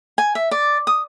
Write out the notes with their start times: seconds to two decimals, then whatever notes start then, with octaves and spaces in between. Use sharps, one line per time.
0.18 G#5
0.35 E5
0.51 D5
0.87 D#6